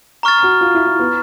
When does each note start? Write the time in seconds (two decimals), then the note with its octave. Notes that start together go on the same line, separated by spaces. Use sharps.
0.23 A#5 C#6 F6 A6
0.43 F#4
0.61 F4
0.74 E4
0.87 E4
0.99 B3